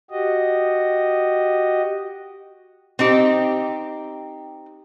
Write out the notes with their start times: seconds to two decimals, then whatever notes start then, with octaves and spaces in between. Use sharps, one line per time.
0.10 F#4 G4 D#5
2.99 C4 D#4 G4